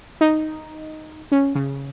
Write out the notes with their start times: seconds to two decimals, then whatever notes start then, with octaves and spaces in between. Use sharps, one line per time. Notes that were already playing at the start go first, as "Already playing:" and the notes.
0.21 D#4
1.32 C#4
1.55 C#3